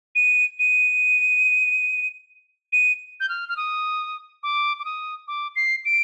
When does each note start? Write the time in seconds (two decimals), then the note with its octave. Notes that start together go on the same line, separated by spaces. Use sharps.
0.15 D#7
0.59 D#7
2.73 D#7
3.20 G6
3.29 F6
3.49 F6
3.57 D#6
4.43 D6
4.79 D6
4.85 D#6
5.28 D6
5.56 C7
5.85 D7